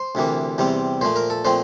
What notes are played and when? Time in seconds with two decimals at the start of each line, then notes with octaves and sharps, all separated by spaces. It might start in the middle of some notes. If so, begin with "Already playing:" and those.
Already playing: C5
0.15 D2 C3 E3 A#3
0.58 E2 C3 G3 C4
1.01 A#2 F3 A3 C5
1.16 A#4
1.30 A4
1.45 A#2 F3 A3 C4 C5